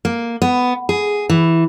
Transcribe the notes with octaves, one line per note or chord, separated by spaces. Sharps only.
A#3
B3
G#4
E3